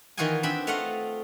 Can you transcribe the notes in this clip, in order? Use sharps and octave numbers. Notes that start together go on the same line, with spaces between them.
D#3 E3 F4 F#4 D#5 G#5
C4 D4 E5 B5
A3 F4 D#5 F5 F#5